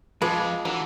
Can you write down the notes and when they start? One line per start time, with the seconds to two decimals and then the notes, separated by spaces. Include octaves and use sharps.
0.22 F2 F3 G#3 B4 D6
0.65 D3 E3 F#3 A#4